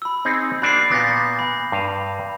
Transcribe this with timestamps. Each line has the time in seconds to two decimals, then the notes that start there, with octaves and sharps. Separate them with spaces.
0.02 B5 E6
0.25 C4 D#4 G#4
0.62 A#3 D4 F#4 B5 D6 C7
0.91 A#2 B3 G6 A6 A#6
1.39 B5
1.72 G2 F5